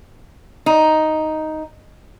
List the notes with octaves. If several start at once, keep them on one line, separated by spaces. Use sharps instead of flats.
D#4